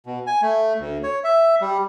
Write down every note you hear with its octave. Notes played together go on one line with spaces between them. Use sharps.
B2
G#5
A3
D2
C#5
E5
G3